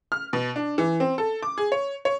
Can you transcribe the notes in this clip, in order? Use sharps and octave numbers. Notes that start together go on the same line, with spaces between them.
F6
B2
D4
E3
C4
A4
D6
G#4
C#5
C#5